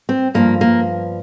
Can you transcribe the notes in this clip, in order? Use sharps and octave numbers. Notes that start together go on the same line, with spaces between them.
C4
G2 F3 A#3
A#3